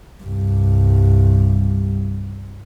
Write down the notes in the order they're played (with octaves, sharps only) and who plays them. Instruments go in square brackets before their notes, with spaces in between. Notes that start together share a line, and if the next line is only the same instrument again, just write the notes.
[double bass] C2 G2